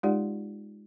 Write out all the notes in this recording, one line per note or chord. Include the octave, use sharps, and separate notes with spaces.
G#3 D#4 F4 G4 D5 F#5